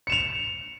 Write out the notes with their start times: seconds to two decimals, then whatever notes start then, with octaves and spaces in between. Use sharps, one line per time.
0.07 C#7
0.10 E7
0.12 F7